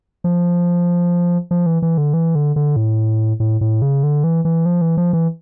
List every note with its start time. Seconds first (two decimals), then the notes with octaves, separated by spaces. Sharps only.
0.24 F3
1.51 F3
1.66 E3
1.82 E3
1.98 D3
2.14 E3
2.35 D3
2.56 D3
2.76 A2
3.40 A2
3.61 A2
3.82 C#3
4.03 D3
4.24 E3
4.45 E3
4.66 F3
4.81 E3
4.97 F3
5.13 E3